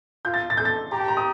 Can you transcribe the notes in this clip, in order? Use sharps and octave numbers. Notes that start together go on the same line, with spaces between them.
F4 G6
A6
A6
A4 G6
A6
G4 A#5
A5
A#5
D#6